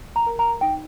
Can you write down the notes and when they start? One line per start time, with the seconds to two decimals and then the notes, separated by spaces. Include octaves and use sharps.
0.16 A#5
0.26 A#4
0.39 A#5
0.61 D#4 G5